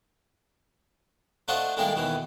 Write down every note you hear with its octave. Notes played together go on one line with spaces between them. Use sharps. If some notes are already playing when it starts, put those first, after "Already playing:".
A3 D4 F4 F#4 C5 D#5
A2 D#3 G3 G#3 A#3 D4
D#2 B2 D#3 E3